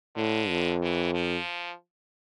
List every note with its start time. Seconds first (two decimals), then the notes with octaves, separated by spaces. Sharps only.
0.16 A2 D3
0.49 F2
0.82 E3
1.14 F3